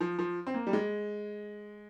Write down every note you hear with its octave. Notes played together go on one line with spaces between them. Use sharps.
F3
F3
C4
A#3
G3
G#3